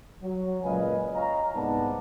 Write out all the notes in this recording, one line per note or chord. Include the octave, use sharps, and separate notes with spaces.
F#3
C#2 A#2 B4 D#5 F5 G#5
C#5 D#5 F5 A#5
C2 G#2 B3 D5 A5